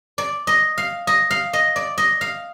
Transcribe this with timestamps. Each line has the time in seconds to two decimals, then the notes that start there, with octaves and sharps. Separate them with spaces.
0.18 D5
0.47 D#5
0.78 F5
1.07 D#5
1.31 F5
1.53 D#5
1.76 D5
1.98 D#5
2.21 F5